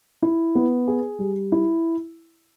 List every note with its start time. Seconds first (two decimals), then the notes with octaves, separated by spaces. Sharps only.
0.22 E4
0.55 B3
0.88 G#4
1.19 G3
1.52 E4